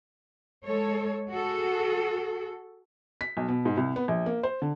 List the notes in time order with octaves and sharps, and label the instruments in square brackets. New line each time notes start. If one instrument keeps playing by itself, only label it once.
[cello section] G#3 A4 C#5
F#4 G#4 A4
[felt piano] B6
B1
B2
G#2
C2
B3
A#1
A#3
C5
D3